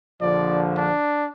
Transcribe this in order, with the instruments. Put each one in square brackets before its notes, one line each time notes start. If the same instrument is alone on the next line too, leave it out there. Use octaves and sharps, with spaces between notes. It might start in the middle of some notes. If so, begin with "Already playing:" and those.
[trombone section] A#1 D3 F3 [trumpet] D5
[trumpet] D4